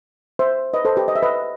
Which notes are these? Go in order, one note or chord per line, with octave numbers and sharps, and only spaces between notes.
C5 E5
B4 D#5
A4 C5
G4 B4
D#5
E5
B4 D#5